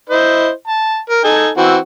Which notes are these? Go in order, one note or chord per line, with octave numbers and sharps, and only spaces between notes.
E4 C5 D#5
A5
A#4
D#4 A4 G#5
E3 C4 F#4